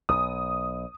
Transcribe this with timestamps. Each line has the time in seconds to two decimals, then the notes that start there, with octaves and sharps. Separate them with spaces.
0.09 B1 D#6